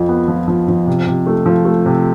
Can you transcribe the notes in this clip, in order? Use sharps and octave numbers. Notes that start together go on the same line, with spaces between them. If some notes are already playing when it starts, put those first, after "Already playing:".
Already playing: F2 F3
B3
F3
F3
F3
C3
C3
A3
F3
A3
C3